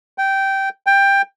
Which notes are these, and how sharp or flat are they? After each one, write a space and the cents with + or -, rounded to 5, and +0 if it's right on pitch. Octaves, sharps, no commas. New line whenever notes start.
G5 -10
G5 +15